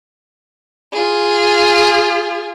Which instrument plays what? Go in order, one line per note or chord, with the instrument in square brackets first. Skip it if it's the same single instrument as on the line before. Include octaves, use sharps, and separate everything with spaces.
[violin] F4 G#4